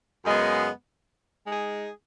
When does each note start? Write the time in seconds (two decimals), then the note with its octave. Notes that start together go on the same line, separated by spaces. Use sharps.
0.25 F#2 C#3 G#3 B3
1.46 G#3 D#4 G#4